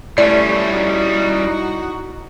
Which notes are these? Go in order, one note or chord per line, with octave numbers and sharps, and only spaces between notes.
G3 A3 C#4 E4 C#5 D5
D#4 F#4